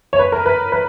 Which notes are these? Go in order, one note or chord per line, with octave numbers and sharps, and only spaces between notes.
C#5
B4
A#4
B4
B4